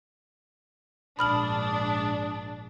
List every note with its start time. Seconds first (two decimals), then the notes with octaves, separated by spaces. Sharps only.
1.19 A#1 G#2 D4 B5 D#6 F6 F#7